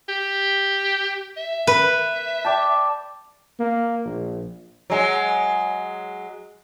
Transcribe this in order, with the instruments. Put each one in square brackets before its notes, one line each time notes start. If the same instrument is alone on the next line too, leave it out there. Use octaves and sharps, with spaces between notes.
[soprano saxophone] G4
E5
[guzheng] B4
[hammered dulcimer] D5 G5 A5
[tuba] A#3
A#1
[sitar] F#3 G#3